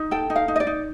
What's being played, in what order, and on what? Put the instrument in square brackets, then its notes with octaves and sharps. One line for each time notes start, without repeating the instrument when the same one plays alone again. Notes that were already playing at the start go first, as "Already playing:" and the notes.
Already playing: [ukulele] D#4
A4 G5
D#4
F5
D#4
D#5
D5
D#4